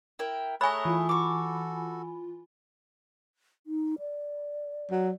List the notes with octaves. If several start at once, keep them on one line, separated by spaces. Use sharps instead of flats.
E4 A#4 G5
A3 G#4 C#5 E5 G#5 A#5 B5 F#6
E3 F4
F#4 A4 C#6 D6
D#4
D5
F#3